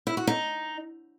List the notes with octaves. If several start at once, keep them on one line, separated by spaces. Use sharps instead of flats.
E4
F#4
D#4